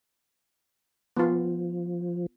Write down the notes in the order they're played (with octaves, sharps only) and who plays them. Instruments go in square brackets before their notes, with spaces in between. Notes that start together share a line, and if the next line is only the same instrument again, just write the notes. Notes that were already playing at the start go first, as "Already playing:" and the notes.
[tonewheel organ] F3 [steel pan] B3 F4